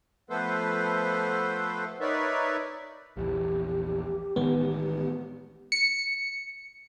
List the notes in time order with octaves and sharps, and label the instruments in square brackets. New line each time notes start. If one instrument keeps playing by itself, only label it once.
[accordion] F3 A3 B3 A4 B4 C5
D#4 A#4 B4 C#5 D5 E5
[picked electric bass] A#1 E2 E3 [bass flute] G4
[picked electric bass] A1 D#3 G#3 [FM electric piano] B3
[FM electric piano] C#7